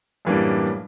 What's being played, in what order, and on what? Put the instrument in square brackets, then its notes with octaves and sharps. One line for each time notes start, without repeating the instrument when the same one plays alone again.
[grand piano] F#2 A2 E3 G3 A#3 D4